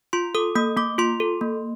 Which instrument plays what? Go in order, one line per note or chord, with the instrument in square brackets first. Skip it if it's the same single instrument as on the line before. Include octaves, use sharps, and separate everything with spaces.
[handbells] F4 C6
A4 D#6
A#3 D#6
A#3 D6
F4 C6
A4
A#3